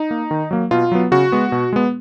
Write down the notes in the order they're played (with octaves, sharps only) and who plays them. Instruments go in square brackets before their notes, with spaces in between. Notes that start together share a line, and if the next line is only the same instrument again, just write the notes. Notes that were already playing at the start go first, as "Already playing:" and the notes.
Already playing: [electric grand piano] D#4
A#3
D#3
F#3 A#3
B2 F4
F#3 B3
C#3 F#4
G#3 B3
B2
G#3 B3